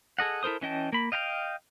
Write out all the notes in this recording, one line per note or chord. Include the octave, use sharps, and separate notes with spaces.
G#4 A4 D#5 F#5
E4 A4 A#4 C5 D#6
E3 C#4 D#5 G5 A5
A#3 B5
D#5 F5 G5 A#5 F6